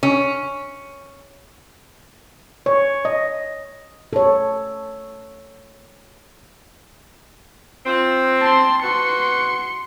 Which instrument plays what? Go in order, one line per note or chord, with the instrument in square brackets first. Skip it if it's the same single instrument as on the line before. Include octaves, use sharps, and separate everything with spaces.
[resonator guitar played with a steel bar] C#4
[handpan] C#5
D#5
A4 C#5
[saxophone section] C4 [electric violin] F4
[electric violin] A5 C6
[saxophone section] F#4 B4 [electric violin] C6 C#7